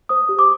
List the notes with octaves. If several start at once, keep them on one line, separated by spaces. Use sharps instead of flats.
C5 D#6
G4
D6